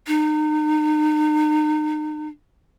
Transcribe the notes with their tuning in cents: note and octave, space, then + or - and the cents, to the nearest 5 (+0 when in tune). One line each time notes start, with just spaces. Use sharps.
D#4 -35